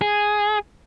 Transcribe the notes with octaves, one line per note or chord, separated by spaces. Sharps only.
G#4